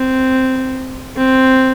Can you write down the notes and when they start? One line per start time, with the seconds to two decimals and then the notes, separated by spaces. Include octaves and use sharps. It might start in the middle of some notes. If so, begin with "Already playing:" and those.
Already playing: C4
1.17 C4